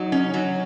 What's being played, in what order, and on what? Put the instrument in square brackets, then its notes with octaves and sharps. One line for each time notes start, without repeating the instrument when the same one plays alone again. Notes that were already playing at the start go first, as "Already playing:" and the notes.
Already playing: [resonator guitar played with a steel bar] F#3 [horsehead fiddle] D#4
[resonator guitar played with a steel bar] C#4
F#3